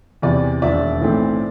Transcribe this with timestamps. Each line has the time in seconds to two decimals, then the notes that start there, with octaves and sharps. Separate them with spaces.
0.22 E2 C3 E3 D5
0.62 E1 D#2 D#3 D5 E5
1.01 B1 A2 E3 A3 C4